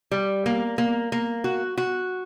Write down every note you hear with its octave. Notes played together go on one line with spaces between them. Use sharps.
G3
A#3
A#3
A#3
F#4
F#4